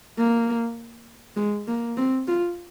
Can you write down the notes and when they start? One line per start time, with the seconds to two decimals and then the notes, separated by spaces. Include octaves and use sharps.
0.18 A#3
1.37 G#3
1.67 A#3
1.97 C4
2.27 F4